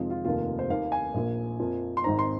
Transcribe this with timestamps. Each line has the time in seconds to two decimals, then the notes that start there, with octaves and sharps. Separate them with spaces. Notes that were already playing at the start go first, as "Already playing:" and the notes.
Already playing: F2 C3 D#3 G#3 F4
0.10 F4
0.25 F1 D#2 D#3 A#3 F4
0.59 C5
0.70 D#2 D#3 A#3 F5
0.92 G#5
1.14 A#1 A#2 A#3
1.60 F2 F3 A#3
1.97 C6
2.04 G#1 G#2 D#3 C4 A#5
2.19 C6